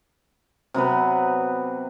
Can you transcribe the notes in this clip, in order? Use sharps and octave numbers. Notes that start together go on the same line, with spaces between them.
C3 F#3 B3 B4